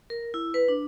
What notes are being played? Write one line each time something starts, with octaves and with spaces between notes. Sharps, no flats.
A#4
E4
B4
D4